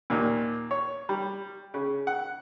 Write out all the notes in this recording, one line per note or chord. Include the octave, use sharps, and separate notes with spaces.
D#2 A#2
C#5
G3
C#3
F#5